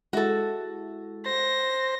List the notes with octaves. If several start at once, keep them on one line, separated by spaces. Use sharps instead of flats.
G#3 E4 F#4 A4
C5 A#6